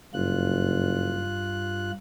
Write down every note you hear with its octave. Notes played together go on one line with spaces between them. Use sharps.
F#1 G2 F4 F#6